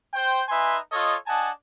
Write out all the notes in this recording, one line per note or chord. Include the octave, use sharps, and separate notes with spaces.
C5 G5
D#4 B4 E5 G#5 C6
F4 A4 C#5 D#5
D4 D#5 F#5 G#5 A5